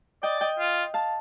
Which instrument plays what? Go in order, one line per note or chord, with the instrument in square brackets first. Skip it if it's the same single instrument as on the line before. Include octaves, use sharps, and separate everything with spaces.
[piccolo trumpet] D5 [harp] D#5 G5
[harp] D#5 G5
[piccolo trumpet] F4
[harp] F5 A5